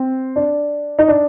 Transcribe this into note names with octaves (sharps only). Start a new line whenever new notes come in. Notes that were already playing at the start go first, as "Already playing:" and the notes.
Already playing: C4
D4
D#4
D4